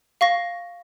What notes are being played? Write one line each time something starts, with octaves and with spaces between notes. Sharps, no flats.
F5 C#6 A#6